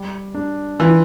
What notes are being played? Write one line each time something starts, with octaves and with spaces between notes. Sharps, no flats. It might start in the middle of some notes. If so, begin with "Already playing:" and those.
Already playing: G3
D4
E3 F4